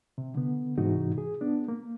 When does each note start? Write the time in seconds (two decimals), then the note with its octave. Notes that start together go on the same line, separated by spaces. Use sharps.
0.18 C3
0.35 D3 B3
0.78 G#2 C3 E3 D#4 F#4
1.18 G#4
1.41 B3 D4
1.68 A#3